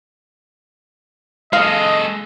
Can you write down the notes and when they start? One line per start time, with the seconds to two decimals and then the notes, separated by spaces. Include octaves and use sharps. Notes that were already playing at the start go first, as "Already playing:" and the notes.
1.53 G#3 A4 D#5 F5